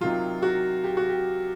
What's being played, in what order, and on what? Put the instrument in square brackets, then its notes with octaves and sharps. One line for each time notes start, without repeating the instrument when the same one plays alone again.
[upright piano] C3 D#3 F#3 F4
F#4
G4
F#4
G4